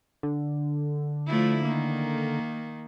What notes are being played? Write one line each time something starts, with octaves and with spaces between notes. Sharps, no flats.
D3
F3 A3 E4
D#3 A#3